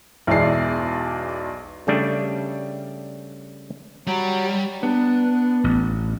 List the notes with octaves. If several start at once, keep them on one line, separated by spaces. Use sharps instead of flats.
B1 E2 E3 G#3 D5 C7
C#3 G3 A3 D4
F#3 G3
B3 D4
A1